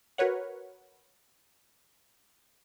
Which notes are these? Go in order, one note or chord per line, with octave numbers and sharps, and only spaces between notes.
F#4 A#4 B4 C#5 F#5